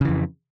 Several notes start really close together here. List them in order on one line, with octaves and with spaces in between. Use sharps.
C#3 E3 F2